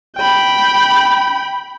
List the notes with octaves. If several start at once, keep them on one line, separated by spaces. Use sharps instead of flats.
G5 B5